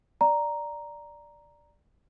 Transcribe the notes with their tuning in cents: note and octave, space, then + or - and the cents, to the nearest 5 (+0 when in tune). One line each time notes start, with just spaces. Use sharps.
D5 +0 A#5 +0